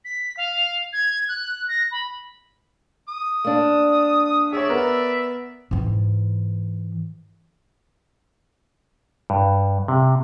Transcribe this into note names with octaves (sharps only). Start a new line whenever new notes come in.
B6
F5
G#6
F#6
A#6
B5
D#6
A#3 D4
G#4 C#5 D5 E5
B3 A#4
G#2 E3
G2
C3